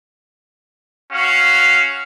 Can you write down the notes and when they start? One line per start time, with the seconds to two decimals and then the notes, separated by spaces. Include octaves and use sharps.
1.12 C#4 F#4 F5